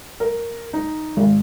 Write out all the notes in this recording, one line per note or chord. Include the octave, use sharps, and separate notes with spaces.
A#4
D#4
G#1